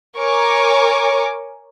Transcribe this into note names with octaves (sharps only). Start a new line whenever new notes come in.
A#4 C#5 G#5 C#6 D6